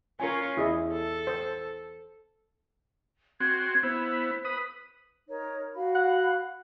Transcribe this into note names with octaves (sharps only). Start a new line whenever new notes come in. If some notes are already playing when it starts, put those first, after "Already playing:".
C#4 F4 A#4 C#5 G#5
E2 E4 G#4 D#5
A4
C5
C4 F#4 G#6
B3 E4 C5
B4 D#6
D#4 A#4 C#5
F#4 F5 B5
F#5